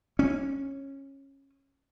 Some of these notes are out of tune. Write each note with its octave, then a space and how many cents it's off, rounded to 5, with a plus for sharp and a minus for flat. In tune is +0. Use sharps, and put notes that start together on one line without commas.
C#4 -15